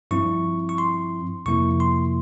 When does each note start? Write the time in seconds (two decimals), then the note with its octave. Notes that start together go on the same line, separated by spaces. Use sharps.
0.11 G2 F3 C4 E4 C#6
0.69 C#6
0.78 C6
1.46 F2 C3 F3 A#3 E4 C#6
1.80 C6